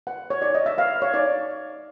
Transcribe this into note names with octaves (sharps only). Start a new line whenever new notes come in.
B4 F#5
C#5
D#4 D5
D#5
E5
B4 F5
C#5
D#4 D5